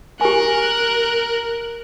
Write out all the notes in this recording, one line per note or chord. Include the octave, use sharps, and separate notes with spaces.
G4 A#4 G#5 F#6